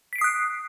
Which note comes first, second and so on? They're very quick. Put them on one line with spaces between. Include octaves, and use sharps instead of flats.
B6 D7 C7 D#6 F#6